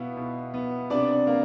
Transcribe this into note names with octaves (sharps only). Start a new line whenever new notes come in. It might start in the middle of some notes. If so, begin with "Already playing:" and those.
Already playing: B2 B3 E4 E5 F5
B2
B3
C3 D4 D5
A#3